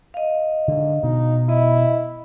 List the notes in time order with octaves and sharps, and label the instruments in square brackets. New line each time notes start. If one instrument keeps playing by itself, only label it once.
[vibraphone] D#5 F5
[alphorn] G#2 [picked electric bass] D3
[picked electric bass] B2 [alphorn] D#4
[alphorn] E4 [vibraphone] D#5